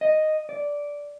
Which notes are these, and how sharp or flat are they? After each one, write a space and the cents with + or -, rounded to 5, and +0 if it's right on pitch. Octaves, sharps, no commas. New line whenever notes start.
D#5 -5
D5 -10